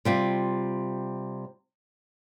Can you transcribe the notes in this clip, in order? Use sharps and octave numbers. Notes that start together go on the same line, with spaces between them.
C3 G3 F4